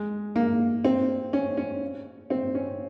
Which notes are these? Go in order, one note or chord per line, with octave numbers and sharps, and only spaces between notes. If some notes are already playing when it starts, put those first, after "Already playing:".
Already playing: G#3
A#3
C4
C#4
C#4
C4
C#4